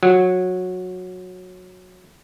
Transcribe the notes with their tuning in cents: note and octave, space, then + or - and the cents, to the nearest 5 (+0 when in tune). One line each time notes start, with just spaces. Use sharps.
F#3 -15